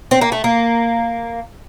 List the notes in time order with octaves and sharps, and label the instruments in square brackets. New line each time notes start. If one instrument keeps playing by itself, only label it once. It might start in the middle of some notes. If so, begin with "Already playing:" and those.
[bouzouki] C4
A#3
A3
A#3